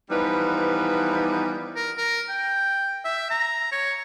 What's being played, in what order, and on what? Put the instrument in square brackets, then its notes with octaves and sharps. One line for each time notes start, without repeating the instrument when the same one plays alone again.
[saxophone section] E3 F3 G3 B3 D#4 B4
[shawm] A#4
A#4
G5
E5
A#5
C#5